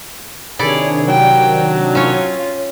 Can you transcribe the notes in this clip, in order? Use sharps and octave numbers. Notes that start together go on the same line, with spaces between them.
C3 D#3 D4 E4 G#4 A4 C#5 D5
F#3 G5
C#4 F4 C#5